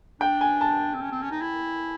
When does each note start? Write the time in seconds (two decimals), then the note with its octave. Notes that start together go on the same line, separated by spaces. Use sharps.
0.20 D4 G5
0.41 G#5
0.61 A5
0.94 C4
1.01 C#4
1.12 C4
1.22 C#4
1.31 D#4
1.41 E4